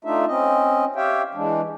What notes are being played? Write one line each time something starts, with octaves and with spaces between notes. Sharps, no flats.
A3 D4 D#4 F4 E5
C4 C#4 D#5
G4 C#5 E5 F5 G5
E3 G#3 D4